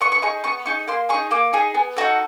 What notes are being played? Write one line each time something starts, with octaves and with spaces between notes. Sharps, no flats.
B3 C#6
C#6
D#4 G#4 C#6
B3 C#6
D#4 G#4 C#6
A#3 C6
G#4 C#6
D#4
A#3 D6
D#4 G#4
B3
D#4 F#4 A4